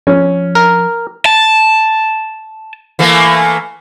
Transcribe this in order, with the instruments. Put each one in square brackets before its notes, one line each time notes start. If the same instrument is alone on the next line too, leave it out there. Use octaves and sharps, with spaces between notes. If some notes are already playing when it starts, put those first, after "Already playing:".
[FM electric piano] F3 [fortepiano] C#4
[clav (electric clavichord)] A#4
[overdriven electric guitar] A5
[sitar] E3 A3 A#3